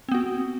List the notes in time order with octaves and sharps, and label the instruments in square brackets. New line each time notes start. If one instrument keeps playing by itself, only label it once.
[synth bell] C4
B3
F#4